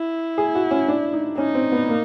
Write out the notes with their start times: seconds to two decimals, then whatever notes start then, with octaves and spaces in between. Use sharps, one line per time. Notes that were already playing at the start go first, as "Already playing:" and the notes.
Already playing: E4
0.38 G#4
0.55 F#4
0.71 C#4
0.88 D4
1.13 D#4
1.38 C#4 D#4
1.55 C4
1.72 B3
1.89 A#3